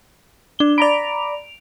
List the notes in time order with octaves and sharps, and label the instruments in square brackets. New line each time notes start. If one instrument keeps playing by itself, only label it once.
[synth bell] D4 G7
[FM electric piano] D5 A#5 B5 [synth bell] D7 F7